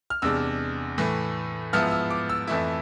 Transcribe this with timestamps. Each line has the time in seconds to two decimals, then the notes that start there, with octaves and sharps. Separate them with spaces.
0.10 F6
0.22 E2 C3 G#3 D4 E6
0.98 A2 E3 A3
1.73 G#2 F3 B3 E4 F6
1.91 E6
2.10 D6
2.29 E6
2.47 F2 E3 A3 E4